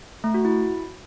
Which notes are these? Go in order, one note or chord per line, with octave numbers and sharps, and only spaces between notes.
A3
F#4
E4